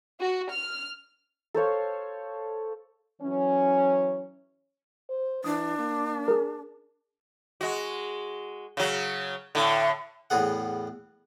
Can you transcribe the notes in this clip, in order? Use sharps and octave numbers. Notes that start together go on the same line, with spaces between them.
F#4
F6
A4 C5 C#5 F5
E3 F#3 C#4
C5
E3 D4 D#6
A#3
G#4 A#4
G#3 F#4
C#3 F#3
A2 D3
E2 A2 B3 G#4 F#5